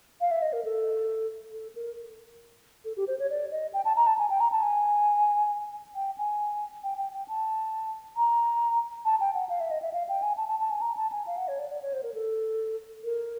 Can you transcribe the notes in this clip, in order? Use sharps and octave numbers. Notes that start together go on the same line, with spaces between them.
F5
E5
D#5
A#4
A4
A4
A#4
A4
G4
C5
C#5
D5
D#5
G5
A5
A#5
A5
G#5
G5
A#5
A5
G#5
G5
G#5
G5
G5
G5
A5
A#5
A5
G5
F#5
F5
E5
D#5
E5
F5
G5
G#5
A5
A5
A5
G#5
A#5
A5
G#5
F5
F#5
C#5
D5
D5
C#5
C5
A#4
A4
A#4